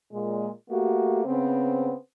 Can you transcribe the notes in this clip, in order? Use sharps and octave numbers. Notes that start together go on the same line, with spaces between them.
A#2 G#3
A3 A#3 F#4 G4
C#3 B3 C4